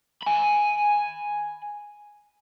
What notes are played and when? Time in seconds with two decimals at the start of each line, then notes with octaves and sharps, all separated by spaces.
0.23 G#5 B5